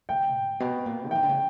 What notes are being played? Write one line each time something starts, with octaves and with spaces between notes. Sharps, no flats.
D3 G5
G#2
B2
A#2
E3
D#3 G5
D3
C#3